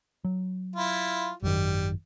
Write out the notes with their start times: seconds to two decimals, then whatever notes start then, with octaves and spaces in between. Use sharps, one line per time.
0.24 F#3
0.75 E4 F4
1.42 G#1 F#2 D#3 G3